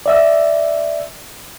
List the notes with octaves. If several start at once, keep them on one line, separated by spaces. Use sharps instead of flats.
D5 E5 E6